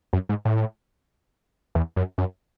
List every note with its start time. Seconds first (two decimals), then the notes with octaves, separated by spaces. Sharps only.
0.13 F#2
0.29 G#2
0.45 A2
1.75 E2
1.96 F#2
2.18 F#2